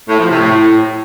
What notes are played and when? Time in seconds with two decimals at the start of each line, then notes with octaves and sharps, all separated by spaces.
0.09 A2
0.19 F3
0.29 C3
0.39 A2